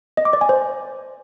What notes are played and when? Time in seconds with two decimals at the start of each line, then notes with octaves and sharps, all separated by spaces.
0.17 D#5
0.25 D6
0.33 D5
0.41 G#5
0.49 C5